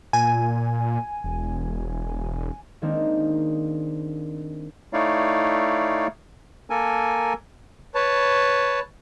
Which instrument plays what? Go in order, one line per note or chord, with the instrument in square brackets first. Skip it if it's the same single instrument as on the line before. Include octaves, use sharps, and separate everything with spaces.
[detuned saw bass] A#2 [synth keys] G#5
[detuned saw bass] E1
[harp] D#3 G#3 A#3 C4 D4 D#4
[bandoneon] A3 D#4 E4 C#5 D5 F5
A#3 A4 A#4 G#5
[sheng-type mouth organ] B4 C#5 A5